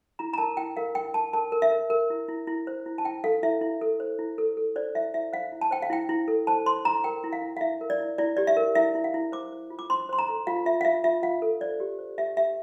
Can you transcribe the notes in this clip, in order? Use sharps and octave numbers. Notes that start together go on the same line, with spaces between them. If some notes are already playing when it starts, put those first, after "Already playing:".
E4 A#5
A#5
A#4 A5
E4 G5
A#4 F5
A#4 G5
A#4 A5
A#4 A5
A#4
E5
A#4
A#4
E4
E4
E4
C5
E4
A5
E4 G5
A4 F5
E4 E5
E4
A4
C5
E4
A4
A4
C5 D5
E4 E5
E4 E5
C5 F5
E4
A5
C5 G5
F5
E4 G5
E4
A4
C5 A5
C5 C6
E4 A#5
A#4 G5
E4
F5
E4
F5
E4 E5
A#4
D5
E4
E4 D5
G4 D5
E5
A#4
E4 E5
E4
F5
E4
C5 D6
C5
F4
D6
C5 C6
C5 C6
A#5
A4
F4 F5
F4 E5
F5
F4 E5
F4 E5
F4 F5
A4
C5 D5
G4
C5
G4 E5
G4 E5